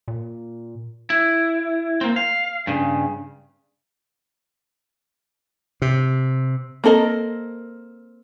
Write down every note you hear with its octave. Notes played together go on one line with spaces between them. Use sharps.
A#2
E4
A#3 C4
F5
G2 C#3
C3
A#3 C4 A4 A#4 D#5